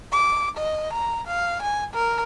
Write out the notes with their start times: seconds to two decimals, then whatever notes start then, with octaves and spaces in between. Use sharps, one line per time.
0.12 D6
0.57 D#5
0.93 A#5
1.27 F5
1.63 G#5
1.94 A#4